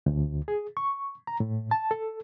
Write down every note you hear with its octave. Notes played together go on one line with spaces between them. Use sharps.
D2
G#4
C#6
A#5
A2
A5
A4